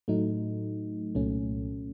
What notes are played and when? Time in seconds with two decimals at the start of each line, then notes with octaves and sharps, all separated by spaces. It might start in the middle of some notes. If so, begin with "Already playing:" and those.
0.08 A2 F#3 A3 D#4
1.15 C2 A#2 F#3 A3 C#4